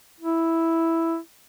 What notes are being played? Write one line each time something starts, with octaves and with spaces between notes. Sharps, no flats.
E4